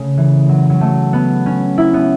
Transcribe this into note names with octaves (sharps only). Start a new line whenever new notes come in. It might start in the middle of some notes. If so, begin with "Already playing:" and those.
Already playing: C#3 A3
E3
F#3
F#3
A3
B3
C#4
E4
B3